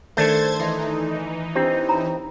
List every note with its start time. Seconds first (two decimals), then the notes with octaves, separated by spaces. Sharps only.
0.17 D#3 A3 D4 A4 C5 G#6 A6
0.60 E3 D#4 D5 E5 C6 C7
1.55 C4 D4 E4 G4 E6
1.88 C#5 A#5 B5